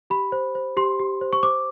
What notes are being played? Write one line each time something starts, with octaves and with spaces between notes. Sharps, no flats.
G4 B5
C5
C5
G4 C6
G4
C5
C#6
C5 D6